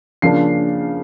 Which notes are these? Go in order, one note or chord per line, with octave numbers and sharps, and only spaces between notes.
C#3 F3 A#3 D4 C7